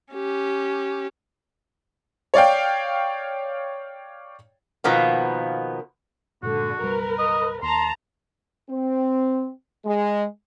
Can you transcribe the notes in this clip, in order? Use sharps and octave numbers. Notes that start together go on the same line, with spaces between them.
C#4 G4
C#5 D5 F5 G5
B2 D#3 F3 A#3 B3
G2 A#2 D3 G#3 F#4
F#1 B1 G3 A#4 B4
D#5
D#2 A5 A#5 C6
C4
G#3